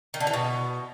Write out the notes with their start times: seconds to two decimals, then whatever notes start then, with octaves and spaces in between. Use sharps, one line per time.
0.14 D#3
0.20 D3
0.27 E3
0.33 B2